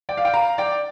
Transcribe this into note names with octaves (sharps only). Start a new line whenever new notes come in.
D5 G5
F5
G5
F5 A#5
D5 G5